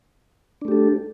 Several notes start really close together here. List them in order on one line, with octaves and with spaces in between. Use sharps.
D4 A3 G4 A4